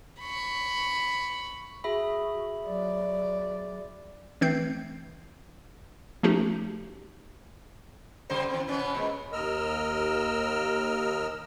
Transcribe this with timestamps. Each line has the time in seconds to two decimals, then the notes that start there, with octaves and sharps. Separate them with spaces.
0.20 B5 C#6
1.84 F#4 G#4 E5 B5
2.67 F#3 D5
4.41 E3 A3 C4 G6 C7
6.23 F3 A3 C#4 D#4 F#4 G4
8.30 C#3 G3 C5
8.50 E3 C4
8.68 B2 B3 C#4
8.95 A#2 G#3
9.33 D#2 A#4 D#5 E6 F6